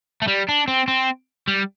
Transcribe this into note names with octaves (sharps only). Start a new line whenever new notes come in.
A3
G3
D4
C4
C4
G3